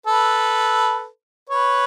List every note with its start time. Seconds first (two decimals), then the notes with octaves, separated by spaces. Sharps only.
0.06 A4 B4
1.50 B4 C#5